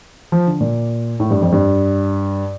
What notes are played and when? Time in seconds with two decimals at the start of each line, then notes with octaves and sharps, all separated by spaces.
0.32 F3
0.47 D3
0.60 A#2
1.20 A2
1.31 G2
1.41 F2
1.52 G2